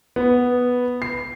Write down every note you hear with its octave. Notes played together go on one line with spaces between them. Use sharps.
B3
C7